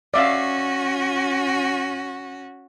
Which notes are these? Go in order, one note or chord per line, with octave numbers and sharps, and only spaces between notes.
C#4 F#4 D5 E5 F5